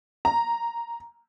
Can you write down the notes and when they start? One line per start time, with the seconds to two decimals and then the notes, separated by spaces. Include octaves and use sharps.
0.25 A#5